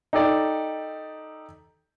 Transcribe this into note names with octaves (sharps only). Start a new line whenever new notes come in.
D#4 G4 A4 D5